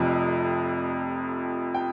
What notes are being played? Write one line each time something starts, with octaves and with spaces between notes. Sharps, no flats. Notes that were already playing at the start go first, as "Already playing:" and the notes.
Already playing: F1 F2 C3 F3
G5